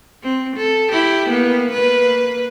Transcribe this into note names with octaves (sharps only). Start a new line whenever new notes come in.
C4
A4
E4 G4
A#3 B3
A#3 B4